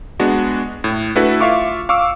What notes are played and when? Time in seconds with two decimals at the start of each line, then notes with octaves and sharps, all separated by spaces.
0.20 G#3 B3 D4 F#4
0.84 A2
1.15 A3 D4 E4 F#4 A4 B4
1.40 F4 E5 F5 C#6 D6
1.89 F5 C#6 D6 E6